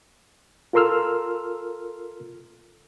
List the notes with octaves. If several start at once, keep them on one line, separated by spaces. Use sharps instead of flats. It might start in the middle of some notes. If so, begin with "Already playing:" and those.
F4 A4 A#4 C6 E6 F6